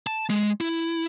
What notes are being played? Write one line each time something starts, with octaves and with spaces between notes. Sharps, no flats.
A5
G#3
E4